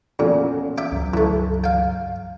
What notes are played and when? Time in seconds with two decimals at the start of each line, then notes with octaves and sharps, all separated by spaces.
0.19 F2 A#2 B3 C#4
0.78 E5 G5 D6
0.92 C#2 G2 F#3
1.14 E3 A3
1.64 F5 G5